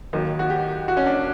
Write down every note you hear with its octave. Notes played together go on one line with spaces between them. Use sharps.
D#2 D#3 F#3
F#4
G4
F#4
C#4
D4